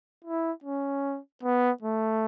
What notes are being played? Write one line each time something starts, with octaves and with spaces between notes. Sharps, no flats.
E4
C#4
B3
A3